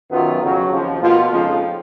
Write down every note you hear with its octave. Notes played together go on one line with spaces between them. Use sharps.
F#2 D#3 F#3 B3 F4
F2 C#3 F#3
D#2 C#3 F3
B2 A#3 F4
F2 C#3 F3 G#3 D#4